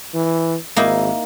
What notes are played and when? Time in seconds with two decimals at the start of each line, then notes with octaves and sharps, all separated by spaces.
0.14 E3
0.76 G#1 A#3 D#4 E4